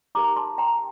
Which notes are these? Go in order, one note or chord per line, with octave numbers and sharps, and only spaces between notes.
D#4 G4 A#4 A#5 D6
A5 C6
G5 A#5